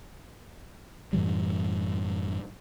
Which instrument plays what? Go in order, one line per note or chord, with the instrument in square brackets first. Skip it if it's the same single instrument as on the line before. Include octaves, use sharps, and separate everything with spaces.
[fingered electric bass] F#2 A2 E3 G3